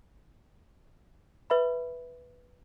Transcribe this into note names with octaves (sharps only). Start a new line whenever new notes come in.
B4 E5 B5